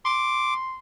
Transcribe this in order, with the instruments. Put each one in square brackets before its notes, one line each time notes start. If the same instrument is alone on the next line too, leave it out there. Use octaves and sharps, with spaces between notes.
[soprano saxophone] C6 [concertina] D6